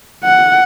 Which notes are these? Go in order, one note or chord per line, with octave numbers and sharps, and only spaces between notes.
F#5